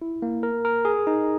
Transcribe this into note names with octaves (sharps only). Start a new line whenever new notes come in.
E4
A#3
A#4
A#4
G#4
D#4